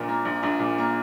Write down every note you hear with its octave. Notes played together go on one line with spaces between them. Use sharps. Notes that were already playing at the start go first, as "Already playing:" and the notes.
Already playing: A#1 A#2
A#3
A#1
A#1
A#2
A#3